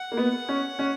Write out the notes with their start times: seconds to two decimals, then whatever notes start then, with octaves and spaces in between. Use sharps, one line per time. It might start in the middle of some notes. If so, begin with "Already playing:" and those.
Already playing: F#5
0.12 A#3
0.17 B3
0.49 C#4
0.79 C#4